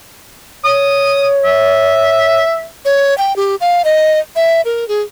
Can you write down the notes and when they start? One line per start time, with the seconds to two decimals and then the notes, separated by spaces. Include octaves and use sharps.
0.65 C#5 D#6
1.44 E5
2.85 C#5
3.18 G5
3.36 G4
3.61 F5
3.85 D#5
4.36 E5
4.65 A#4
4.88 G#4